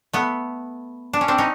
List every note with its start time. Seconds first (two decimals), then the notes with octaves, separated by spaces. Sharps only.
0.13 A3 B3
1.13 D4
1.21 C#4
1.28 C4 D4
1.38 C#4 D#4